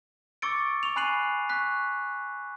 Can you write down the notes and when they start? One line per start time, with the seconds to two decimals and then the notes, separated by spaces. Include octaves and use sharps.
0.42 C#6 D6 E6 A6 C#7 D7
0.83 C#6 F7
0.96 G#5 B5 F#6 C7 D#7 F#7
1.49 C#6 F#6 B6